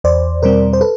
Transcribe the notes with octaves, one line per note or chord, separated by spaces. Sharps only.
E2 C5 D5
B2 G3 C4 A#4 C5
C5
A4 B4